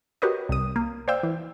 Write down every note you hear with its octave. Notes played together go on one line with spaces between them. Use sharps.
F#4 G4 A#4 B4 C#5 D#5
C2 D#6
A#3
C5 D5 F5 G5 E6
E3